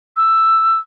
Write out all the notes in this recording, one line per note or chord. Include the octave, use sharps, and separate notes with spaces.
E6